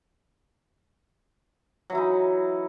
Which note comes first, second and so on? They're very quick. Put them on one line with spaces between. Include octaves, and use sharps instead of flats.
F#3 E3 E4 D#4